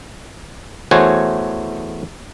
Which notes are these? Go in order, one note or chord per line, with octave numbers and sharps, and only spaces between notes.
E2 A3 F#4 C5 C#5 G#5